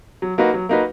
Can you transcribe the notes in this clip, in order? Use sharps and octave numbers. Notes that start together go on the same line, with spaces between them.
F#3
A#3 D#4 F#4 B4
F#3
A#3 D#4 F#4 B4